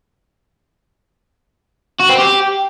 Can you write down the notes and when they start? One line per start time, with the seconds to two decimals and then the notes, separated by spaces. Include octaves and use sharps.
2.00 F#4
2.09 C4
2.18 G4